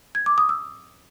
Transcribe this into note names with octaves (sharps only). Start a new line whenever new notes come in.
G#6
D6
D#6
E6